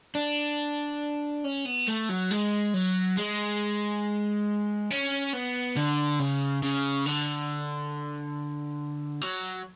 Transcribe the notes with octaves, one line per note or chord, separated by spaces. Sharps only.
D4
C#4
B3
A3
F#3
G#3
F#3
G#3
C#4
B3
D3
C#3
C#3
D3
F#3